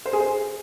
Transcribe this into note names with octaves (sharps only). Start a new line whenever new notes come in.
C5
G#4
C5